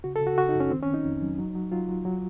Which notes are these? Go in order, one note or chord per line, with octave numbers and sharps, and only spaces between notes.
C#3 F#4
A4
C#3
F#4
C#3 F#4
D#4
F#2
C#4
D#3 C4
C#4
D#3
D#4
F2
F#3
F#3
F#3
F#3 F4
F#3
F#3